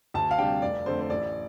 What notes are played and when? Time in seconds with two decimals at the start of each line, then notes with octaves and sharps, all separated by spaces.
0.14 D2 A5
0.31 F5
0.38 C3 G3 D4 G5
0.62 F1 D5
0.86 F2 D3 A3 C5
1.01 C5
1.10 A1 D5